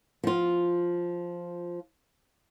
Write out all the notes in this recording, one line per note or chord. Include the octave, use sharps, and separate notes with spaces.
F3 F4